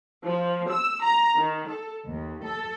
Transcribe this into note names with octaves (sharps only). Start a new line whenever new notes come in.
F3
E6
A#5
D#3
A4
D#2
A4